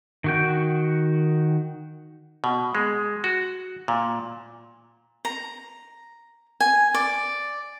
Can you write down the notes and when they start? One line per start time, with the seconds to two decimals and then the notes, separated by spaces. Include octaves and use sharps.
0.24 D#3 F#4 G5
2.44 B2
2.75 G#3
3.24 F#4
3.88 A#2
5.25 A#5
6.60 G#5
6.94 D5